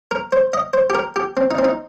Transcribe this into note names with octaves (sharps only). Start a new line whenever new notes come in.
A#4
C5
D#5
C5
G4
A#4
G4
C4
D#4
C4
D#4